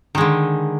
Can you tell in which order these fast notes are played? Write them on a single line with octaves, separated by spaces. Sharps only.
D#3 G#3 D3